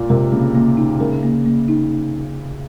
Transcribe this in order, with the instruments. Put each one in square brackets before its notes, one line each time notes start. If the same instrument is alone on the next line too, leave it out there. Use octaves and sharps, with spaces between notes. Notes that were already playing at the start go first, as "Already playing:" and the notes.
Already playing: [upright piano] A#2
[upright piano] C3 [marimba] A#4
[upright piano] C#3 [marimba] A#3
[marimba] A#3
D#4
[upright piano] C#3 [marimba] A#4
[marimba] A#3
A#3
D#4